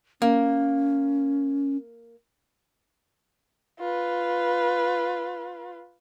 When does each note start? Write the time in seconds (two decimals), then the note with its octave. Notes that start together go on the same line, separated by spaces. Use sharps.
0.22 A#3 C#4
3.79 F4 B4